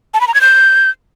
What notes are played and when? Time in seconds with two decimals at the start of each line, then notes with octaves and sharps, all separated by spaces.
0.14 A5
0.21 B5
0.28 A#5
0.34 G#6
0.41 G6